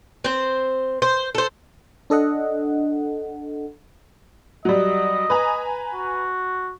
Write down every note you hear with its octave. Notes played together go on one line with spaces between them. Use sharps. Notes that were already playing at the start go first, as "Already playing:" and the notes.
C4 C5
C5
A4 C5
D4 A4 D#5 F#5
F#3 G3 D#5
B4 G#5 A#5
F#4